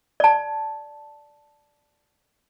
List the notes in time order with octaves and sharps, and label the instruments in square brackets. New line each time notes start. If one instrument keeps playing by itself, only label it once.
[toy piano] D5 A5